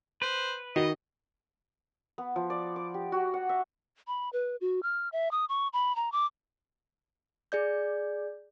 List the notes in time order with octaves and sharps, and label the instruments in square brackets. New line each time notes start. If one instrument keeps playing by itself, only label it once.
[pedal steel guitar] B4 [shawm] C5
[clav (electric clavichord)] D#3 [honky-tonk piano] F#4 [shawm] D#5
[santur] B3
F3
D5
D6
G4
F#4
F#5
E5
[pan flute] B5
B4
F#4
F6
E5
D#6
C#6
B5
A#5
D6
[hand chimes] G#4 D5 G6